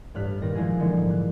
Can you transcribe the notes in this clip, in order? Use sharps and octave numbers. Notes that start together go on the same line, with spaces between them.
A1 G2 F6 F#6 B6
A#2 D#3 A#6
A#2 F3 G#3 E4 G#4
D3 E3 G#3 A#3 D#4
G#2
F#6